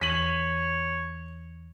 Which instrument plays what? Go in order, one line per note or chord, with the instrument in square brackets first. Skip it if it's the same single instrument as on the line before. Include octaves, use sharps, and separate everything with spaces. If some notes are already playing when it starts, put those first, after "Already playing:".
[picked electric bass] E2 [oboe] C#5 [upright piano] B6 D#7 F#7